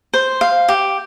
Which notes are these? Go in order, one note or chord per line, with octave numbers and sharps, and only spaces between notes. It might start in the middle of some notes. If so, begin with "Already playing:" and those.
C5
F5
G4